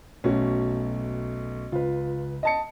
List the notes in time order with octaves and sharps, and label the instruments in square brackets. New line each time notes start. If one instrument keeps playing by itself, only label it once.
[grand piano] B1 A3 [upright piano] C#4 F#4
[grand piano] C#2 B4 [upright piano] F4
[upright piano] D#5 A5 C#7